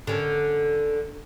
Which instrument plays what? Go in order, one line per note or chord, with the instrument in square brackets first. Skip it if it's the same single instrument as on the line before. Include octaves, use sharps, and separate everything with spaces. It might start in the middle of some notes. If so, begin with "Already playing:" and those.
[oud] D3 C#4 A#4